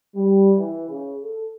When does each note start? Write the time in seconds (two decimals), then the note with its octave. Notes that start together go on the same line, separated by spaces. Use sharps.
0.15 G3
0.56 E3
0.88 C#3
1.22 A4